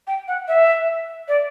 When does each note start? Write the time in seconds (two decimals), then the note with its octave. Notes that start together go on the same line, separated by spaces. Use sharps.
0.07 G5
0.28 F#5
0.48 E5
1.28 D5